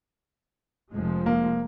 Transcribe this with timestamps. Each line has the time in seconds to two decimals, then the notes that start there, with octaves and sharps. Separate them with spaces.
0.92 F1 F3 G#3
1.26 A#3